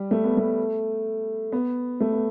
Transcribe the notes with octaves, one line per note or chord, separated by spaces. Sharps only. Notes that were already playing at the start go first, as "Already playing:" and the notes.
Already playing: G3
A3
B3
A3
B3
A3
B3